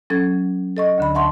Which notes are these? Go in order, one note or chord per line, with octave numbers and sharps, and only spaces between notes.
F#3 C#4 A4 G#6
A4 D#5 C#6
D2 D3 B5
E5 F#5 A5 C6 C#6